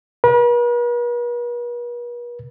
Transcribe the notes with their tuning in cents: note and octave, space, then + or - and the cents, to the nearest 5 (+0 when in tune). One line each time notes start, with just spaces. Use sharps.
B4 -45